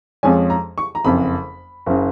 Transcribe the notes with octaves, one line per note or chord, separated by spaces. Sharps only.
F2 F3 G#3 C#4 G#5
A#5
C#6
A#5
F#1 F2 C#3 B5
F#1 C#3